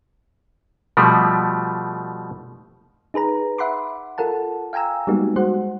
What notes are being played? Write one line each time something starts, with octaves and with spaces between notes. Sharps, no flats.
B2 F3 G3 A3
D#4 G#4 B4 A#5
E5 F#5 B5 C6 D6
F4 A4 A#4 F#5 A5
F5 G5 G#5 A#5 E6
G3 G#3 A#3 B3 D#4 F#4
G#3 F#4 C5 F#5